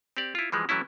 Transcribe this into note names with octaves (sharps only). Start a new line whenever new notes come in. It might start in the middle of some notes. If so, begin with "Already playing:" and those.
C4 G4 D5
E4 F4
E3 F3 G3 G#3
E3 F#3 A3 C#4 E4